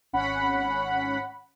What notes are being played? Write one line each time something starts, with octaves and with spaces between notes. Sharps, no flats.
G#1 C#4 F#5 B5